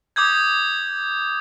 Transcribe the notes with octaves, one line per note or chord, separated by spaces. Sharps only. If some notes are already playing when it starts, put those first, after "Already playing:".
D6 D#6 G6 G#6